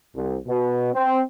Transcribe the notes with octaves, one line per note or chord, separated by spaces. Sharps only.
C2
B2
C4